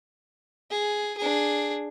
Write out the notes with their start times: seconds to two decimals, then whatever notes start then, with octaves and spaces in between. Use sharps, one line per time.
0.71 G#4
1.17 D4 G#4